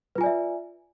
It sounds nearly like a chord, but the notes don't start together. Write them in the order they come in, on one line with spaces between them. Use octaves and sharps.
B4 F4 G#5 D5 E5